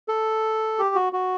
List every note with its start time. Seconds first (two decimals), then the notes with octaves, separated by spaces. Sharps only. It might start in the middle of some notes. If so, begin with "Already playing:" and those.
0.08 A4
0.79 G4
0.95 F#4
1.13 F#4